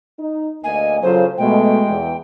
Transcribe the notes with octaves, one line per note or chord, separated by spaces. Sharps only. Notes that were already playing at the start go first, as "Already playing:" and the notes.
D#4
D2 A#3 D#5 G#5
C#3 F#3 F4 A4 C5
B2 G#3 A3 G5
E2